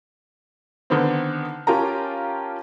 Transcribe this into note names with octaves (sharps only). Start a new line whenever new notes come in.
D3 D#3 B3 C4
C#4 F4 G4 A#4 A5 A#5